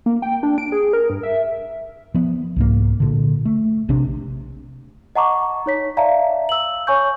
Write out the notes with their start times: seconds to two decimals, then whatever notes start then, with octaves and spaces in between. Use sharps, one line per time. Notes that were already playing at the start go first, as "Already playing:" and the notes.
0.06 A#3
0.22 G5
0.43 D4
0.58 D7
0.72 G#4
0.93 A#4
1.10 G2
1.23 E5
2.14 F3 B3
2.56 C2 G#2 A#3
3.00 A#2 D3
3.45 A3
3.88 A#1 C3 C4 D4
5.16 D#5 F#5 A5 A#5 C#6 D6
5.66 D#4 C#5 B6
5.97 D5 E5 F5 A5 A#5
6.49 E6 F#7
6.87 C#5 G#5 C#6 G6